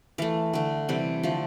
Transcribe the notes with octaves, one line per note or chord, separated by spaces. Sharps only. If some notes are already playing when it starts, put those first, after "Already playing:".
E3 A3 F5
D3 A3
C3 E3 G3
D3 F3 A3